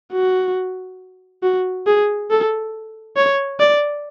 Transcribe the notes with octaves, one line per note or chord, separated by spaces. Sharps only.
F#4
F#4
G#4
A4
C#5
D5